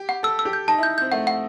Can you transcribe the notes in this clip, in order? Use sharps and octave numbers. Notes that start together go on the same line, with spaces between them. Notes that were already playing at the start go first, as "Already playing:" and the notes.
Already playing: G4
F#5
A4 E6
E6
G4
G6
D#4 A5
E4 G6
C4 G6
A3 F#5
F#5